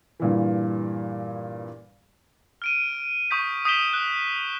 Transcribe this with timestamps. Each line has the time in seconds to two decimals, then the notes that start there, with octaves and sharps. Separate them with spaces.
0.20 G2 A#2 E3
2.62 F6 D7 D#7
3.31 C#6 D#6 G6 B6
3.65 D#6 G6 B6 D7 E7 G7
3.93 F#6